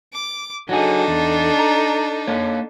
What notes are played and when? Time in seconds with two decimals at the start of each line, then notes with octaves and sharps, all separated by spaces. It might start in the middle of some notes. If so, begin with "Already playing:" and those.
0.14 D6
0.69 F#3 D4 D#4 F#4 G#4 A4
1.08 E2
1.59 A#5
2.27 A#3 C#5